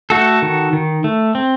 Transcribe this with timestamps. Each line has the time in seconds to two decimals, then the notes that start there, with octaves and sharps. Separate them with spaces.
0.10 A3 F#4 A4
0.42 D#3
0.73 D#3
1.04 A3
1.35 C4